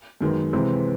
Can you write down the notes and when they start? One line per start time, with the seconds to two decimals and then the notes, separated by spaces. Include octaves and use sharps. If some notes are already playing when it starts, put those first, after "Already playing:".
0.21 F#2 D#3 G#3 B3
0.53 C3 E3 G#3 C4